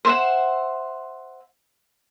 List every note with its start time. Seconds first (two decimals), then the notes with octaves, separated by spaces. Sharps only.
0.05 C5 E5 F#5